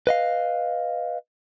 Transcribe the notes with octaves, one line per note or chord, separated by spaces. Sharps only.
B4 D#5 F5